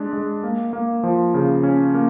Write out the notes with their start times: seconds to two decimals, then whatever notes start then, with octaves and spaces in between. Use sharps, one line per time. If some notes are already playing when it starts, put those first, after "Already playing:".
Already playing: G#3 D4
0.13 G#3
0.43 A#3
0.73 A#3
1.04 F3
1.34 C#3
1.63 C#4
1.94 A#3